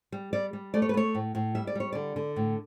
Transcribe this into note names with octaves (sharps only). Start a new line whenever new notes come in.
G3
G3 D5
G3
A3 D5
C#5
B4
A3 C#5
A2
A2
G3 E5
D5
G3 C#5
D3 D5
D3
A2